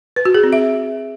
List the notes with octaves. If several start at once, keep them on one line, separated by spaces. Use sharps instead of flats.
B4
F#4
G#4
C4
E5